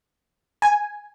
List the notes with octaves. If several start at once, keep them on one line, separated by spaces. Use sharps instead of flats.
G#5